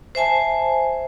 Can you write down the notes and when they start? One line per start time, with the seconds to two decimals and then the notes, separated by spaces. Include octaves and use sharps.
0.15 C5 E5 G#5 A5